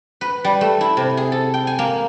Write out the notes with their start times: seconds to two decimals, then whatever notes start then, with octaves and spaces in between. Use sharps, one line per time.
0.21 B4
0.45 G3
0.61 A3
0.81 E4
0.97 C3
1.17 G#4
1.32 A4
1.54 G5
1.67 G#5
1.79 A#3